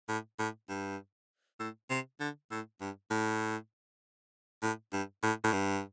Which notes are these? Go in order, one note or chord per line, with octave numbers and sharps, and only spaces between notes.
A2
A2
G2
A2
C3
D3
A2
G2
A2
A2
G2
A2
A2
G2